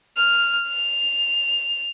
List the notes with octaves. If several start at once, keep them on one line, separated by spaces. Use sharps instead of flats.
F6
F7